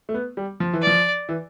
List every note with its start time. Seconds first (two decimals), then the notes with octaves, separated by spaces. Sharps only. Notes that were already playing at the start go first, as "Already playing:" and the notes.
0.09 A3
0.14 B3
0.37 G3
0.60 F3
0.73 E3
0.82 F3 D5
1.29 E3